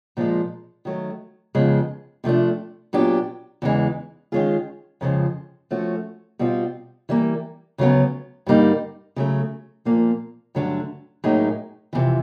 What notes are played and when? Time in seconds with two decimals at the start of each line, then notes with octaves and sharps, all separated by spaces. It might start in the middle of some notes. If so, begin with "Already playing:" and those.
0.17 A#2 F3 G#3
0.85 D#3 F#3 A3
1.55 F2 C#3 F3 G#3 B3
2.24 C3 F3 A3 D4
2.93 A#2 F#3 B3 D4 G4
3.62 E2 C#3 E3 G#3
4.32 D#3 G#3 C#4 F4 G#4
5.01 F2 C#3 F3 G#3
5.71 F3 A3 C#4 F#4
6.39 B2 G3 C4 F4
7.09 E3 G3 A#3
7.78 D2 C#3 F#3 B3
8.46 G2 D3 G3 A#3 D#4
9.16 C#3 F#3 A3
9.85 A#2 F3 A#3
10.55 G2 D3 F#3 A3 D4
11.24 A2 F#3 A#3 D#4 G#4
11.93 F2 C3 E3